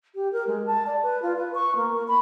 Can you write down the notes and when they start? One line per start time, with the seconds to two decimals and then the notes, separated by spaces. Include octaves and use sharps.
0.15 G4
0.33 A#4
0.47 G#3
0.66 A5
0.87 D5
1.03 B4
1.22 F4
1.36 B4
1.55 C#6
1.76 A#3
1.94 A#4
2.08 B5